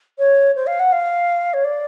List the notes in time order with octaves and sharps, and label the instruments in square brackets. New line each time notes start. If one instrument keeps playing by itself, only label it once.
[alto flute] C#5
C5
F5
F#5
F5
C#5
D5